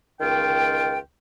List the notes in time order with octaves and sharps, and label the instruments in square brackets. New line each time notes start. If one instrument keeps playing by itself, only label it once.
[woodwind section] C#2 D#3 F4 G5